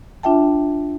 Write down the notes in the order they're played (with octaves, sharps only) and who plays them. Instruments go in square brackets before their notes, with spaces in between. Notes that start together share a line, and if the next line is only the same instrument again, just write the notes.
[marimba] D4 F4 E5 G5 A5